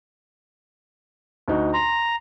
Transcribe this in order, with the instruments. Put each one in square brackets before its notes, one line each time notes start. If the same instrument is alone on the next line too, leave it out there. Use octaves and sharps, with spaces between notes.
[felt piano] D2 D#4 F#4
[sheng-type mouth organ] A#5 [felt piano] C6